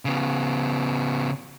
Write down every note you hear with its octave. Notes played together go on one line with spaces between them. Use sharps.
C#3 B3